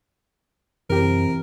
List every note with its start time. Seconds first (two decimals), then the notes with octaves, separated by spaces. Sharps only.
0.90 F#2 C3 E3 G4 A#4